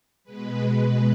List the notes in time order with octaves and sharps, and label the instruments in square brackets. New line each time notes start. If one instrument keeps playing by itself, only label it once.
[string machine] B2 G#3 B4
B4